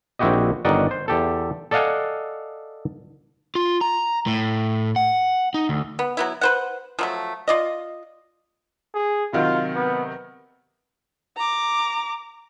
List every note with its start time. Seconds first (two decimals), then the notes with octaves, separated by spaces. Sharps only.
0.19 A#1 C4 E4 F#4 G4 D#5
0.65 G1 D#3 C#4 D5 D#5 F#5
0.91 C5
1.08 E2 G4 A4
1.71 A4 D5 D#5 F5 F#5 G#5
3.55 F4
3.81 A#5
4.27 A2
4.96 F#5
5.54 D#4
5.69 D2
5.99 B3
6.17 F#3 B3 E4
6.41 B4 C5 F#5
6.99 F3 F#3 A3
7.48 F4 D5 D#5
8.94 G#4
9.33 C3 D#3 F#3 F4
9.76 B3
11.36 A#5 D6